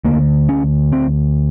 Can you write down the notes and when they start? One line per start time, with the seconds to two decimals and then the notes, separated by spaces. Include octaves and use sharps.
0.05 D2 D3 A#3
0.49 C#4
0.92 C4